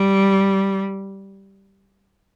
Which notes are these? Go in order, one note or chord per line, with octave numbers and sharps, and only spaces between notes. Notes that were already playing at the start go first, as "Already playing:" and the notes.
Already playing: G3